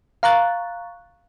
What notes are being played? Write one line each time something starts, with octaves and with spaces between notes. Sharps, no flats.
F5 A#5 C#6 F#6 A6